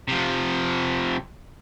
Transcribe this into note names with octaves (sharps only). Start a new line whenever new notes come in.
C3 F3